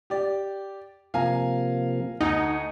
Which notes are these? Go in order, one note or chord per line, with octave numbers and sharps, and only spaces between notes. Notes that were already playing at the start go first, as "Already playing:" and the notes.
G4 D5
C3 F3 A#3 F5 G#5 A#5
D2 D#4 F#5 G#5